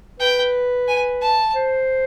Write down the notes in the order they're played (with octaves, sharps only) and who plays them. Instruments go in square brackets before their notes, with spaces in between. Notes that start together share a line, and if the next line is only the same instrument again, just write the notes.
[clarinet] B4 [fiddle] G5
[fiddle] G#5
A5
[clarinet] C5